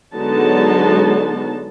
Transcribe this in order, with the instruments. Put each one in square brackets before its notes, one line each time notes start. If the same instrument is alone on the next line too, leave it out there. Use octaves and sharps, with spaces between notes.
[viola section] D3 F#3 G#3 B3 D#4 A5